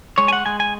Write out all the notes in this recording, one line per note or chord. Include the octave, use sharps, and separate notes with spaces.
G#3 C#5
G#5
F#5
G#3 G#5
G#5